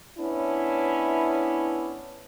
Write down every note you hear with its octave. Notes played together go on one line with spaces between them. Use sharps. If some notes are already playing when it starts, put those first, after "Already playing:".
B3 C#4 D4 E4